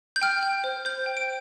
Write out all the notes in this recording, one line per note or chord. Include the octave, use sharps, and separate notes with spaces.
G6
G5 F6
G5
C5
C5 G6
G5
D7